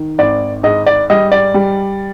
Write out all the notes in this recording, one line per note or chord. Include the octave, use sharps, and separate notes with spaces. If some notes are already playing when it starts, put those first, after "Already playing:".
Already playing: D#3
G#1 D5
G#2 D#5
D5
G3 D#5
D5
G3